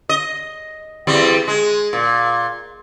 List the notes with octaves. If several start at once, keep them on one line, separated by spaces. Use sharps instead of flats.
D#5
E2 G3 C4
G#3
A#2